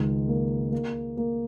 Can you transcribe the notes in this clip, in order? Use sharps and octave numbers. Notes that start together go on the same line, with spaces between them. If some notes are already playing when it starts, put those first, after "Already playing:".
Already playing: C#2 D#3
A#3
A#3
A#3